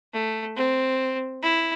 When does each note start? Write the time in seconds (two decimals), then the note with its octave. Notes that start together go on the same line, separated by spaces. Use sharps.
0.13 A3
0.56 C4
1.43 E4